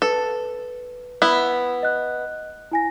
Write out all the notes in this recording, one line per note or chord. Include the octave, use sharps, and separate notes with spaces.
A4 B4
B3 E4
D#5 F#6
E4 G#5 A#6